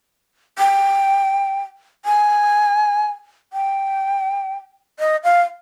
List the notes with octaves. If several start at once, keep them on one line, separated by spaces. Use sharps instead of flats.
G5
G#5
G5
D#5
F5